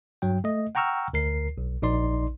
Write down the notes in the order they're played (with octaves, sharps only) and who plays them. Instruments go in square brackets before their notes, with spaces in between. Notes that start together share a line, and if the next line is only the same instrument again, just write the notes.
[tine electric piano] G2 F#3 G5
A3 D#5
F#5 G5 A#5 C#6 E6 F6
D2 A#4 C7
B1
A#1 D#4 D5 C6